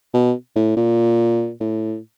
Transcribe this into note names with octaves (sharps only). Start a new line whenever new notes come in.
B2
A2
A#2
A2